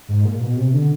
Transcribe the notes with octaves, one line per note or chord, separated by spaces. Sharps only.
G#2
A#2
B2
C3
D3